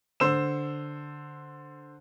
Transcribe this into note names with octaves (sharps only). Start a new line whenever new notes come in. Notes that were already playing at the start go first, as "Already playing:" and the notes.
D3 C5 E6 E7